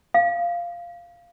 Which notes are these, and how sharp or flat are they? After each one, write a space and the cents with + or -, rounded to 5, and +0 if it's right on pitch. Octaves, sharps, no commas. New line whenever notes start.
F5 -10